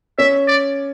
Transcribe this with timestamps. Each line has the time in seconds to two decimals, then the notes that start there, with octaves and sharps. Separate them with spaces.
0.18 C#4 E5
0.47 D5